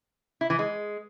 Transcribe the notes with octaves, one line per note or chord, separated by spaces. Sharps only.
E4
E3
G#3